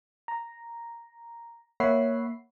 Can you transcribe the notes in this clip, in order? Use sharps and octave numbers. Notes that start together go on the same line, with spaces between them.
A#5
A#3 C#5 E5 F#5 B5 C7